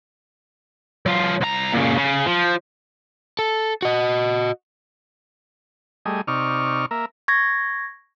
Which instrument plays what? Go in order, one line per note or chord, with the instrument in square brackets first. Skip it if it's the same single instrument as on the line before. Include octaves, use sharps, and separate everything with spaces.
[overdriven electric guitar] F#3 F4
C2 A#5
A#2 C#3
C#3
F3
A4
F#4 D#5
[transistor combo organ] G3 A3 G#4 D#5
C3 D#4 D5 C#6 F6
A#3 A#4 E5
[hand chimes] C#6 G#6 A#6